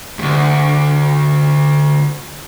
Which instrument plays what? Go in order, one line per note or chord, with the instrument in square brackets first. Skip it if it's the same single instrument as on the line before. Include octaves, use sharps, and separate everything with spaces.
[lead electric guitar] D2 G2